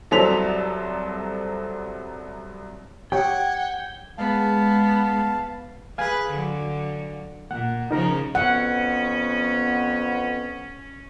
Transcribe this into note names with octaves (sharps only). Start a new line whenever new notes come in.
C2 F#3 A4 C5 B6 F7
G4 C#5 F#5 G5 G#6
G#3 B3 F5 A5
G#4 B4 F5 G#5
D3 F#3
A#2 F#5
C#3 F3 C#4 D#4 A#4 A#5
F2 B3 C#4 F#5